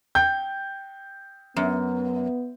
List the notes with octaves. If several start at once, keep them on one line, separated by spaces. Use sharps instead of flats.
G5 G6
F#2 B3